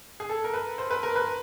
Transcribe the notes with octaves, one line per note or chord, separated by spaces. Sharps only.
G#4
A4
A#4
B4
C5
B4
A#4
B4